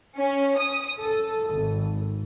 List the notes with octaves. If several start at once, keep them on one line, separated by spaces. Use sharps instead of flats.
C#4
D#6
A4
G#1